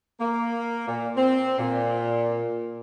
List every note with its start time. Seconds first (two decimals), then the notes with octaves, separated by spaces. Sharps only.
0.20 A#3
0.88 A#2
1.16 C4
1.58 A#2